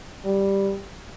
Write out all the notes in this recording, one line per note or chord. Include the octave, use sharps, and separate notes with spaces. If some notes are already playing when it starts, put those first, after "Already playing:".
G3